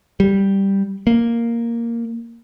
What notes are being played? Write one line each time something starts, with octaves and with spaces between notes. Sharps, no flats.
G3
A#3